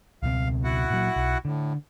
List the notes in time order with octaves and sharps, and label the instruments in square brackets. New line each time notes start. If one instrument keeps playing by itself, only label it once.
[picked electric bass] C#2 B2 C4 [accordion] F5
[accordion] E4 F#4 F#5
[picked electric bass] A#2 F#3
B1
[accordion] A2 [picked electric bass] D3